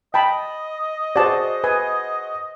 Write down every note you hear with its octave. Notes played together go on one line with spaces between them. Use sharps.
D#5 G5 A5 B5
F#4 G#4 C5 D5 A5
B4 G#5